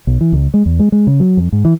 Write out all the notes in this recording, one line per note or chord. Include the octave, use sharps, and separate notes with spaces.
B1
E3
C#2
G#3
E2
G#3
G#3
C#3
F#3
F2
G#2
E3